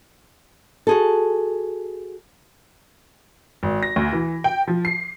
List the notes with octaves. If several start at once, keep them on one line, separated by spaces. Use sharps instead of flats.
F#4 G#4 A4
G#1
A#6
D2
E3
G5
F3
C7